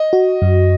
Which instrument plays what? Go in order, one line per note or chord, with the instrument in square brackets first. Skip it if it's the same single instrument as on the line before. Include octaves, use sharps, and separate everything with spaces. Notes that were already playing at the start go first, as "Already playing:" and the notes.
Already playing: [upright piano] D#5
[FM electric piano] F#4
F#2